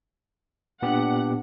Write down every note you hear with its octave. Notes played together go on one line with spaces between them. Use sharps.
A#2 B3 D4 G4 F#5